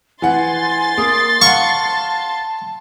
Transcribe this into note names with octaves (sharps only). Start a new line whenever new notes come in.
E3 F#5 G#5 C6 A6
A#3 D#6
F5 F#5 A5 C#6